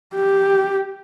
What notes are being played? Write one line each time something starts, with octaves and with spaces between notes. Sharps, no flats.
G4